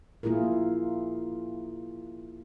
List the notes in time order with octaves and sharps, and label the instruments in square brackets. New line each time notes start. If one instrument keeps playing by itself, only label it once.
[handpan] A#3 E4 F4 G#4 A#4